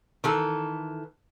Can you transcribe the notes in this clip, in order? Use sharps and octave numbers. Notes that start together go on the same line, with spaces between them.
D#3 E3 A4